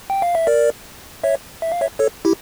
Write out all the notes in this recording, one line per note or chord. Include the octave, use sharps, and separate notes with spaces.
G5
F5
E5
A#4 D5
C#5 E5
E5
F5
C#5 E5
A4 C#5
E4 G4